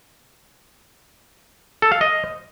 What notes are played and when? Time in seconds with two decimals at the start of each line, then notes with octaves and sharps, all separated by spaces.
1.82 A4
1.92 F5
2.01 D#5